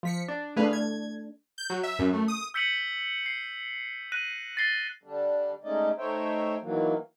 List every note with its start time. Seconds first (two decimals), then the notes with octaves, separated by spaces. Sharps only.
0.03 F3 B6 C#7
0.28 D4
0.57 A3 D4 G#4 B4 F5
0.73 G#6
1.58 G6
1.70 F#3
1.83 E5
1.99 F#2
2.13 A3
2.28 D#6
2.54 E6 G6 B6 C#7 D#7 F#7
3.26 C7
4.12 F#6 A#6 D#7 F#7
4.57 A6 A#6 C7 G7
5.03 D3 G3 D4
5.64 G#3 A3 C#4 D#4 D5 D#5
5.98 A3 D#4 C5 C#5 E5 G5
6.61 D#3 E3 F#3 A#3